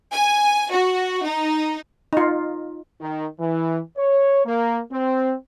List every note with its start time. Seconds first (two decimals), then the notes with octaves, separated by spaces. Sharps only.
0.13 G#5
0.71 F#4
1.26 D#4
2.13 D#4 F4
3.00 D#3
3.39 E3
3.96 C#5
4.45 A#3
4.91 C4